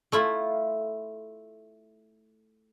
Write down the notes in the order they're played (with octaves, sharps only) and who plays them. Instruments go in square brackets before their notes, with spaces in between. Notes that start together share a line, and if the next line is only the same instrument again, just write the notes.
[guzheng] A3 E4 F4